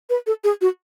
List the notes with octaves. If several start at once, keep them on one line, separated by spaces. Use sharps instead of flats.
B4
A4
G#4
F#4